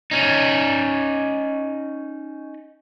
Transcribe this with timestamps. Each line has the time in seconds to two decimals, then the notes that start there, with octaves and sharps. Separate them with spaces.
0.11 C#4 D#4